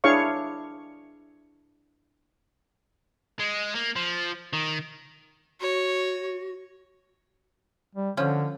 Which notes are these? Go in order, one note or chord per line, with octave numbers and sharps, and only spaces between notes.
D4 E4 G#4 C#5 F5 C#6
G#3
A#3
F3
D#3
F#4 C#5
G3
D3 F3 C#4